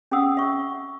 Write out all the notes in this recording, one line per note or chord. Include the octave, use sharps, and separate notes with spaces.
C#4 G#4 F5 F#5 D#6 E6
C#4 E5 C#6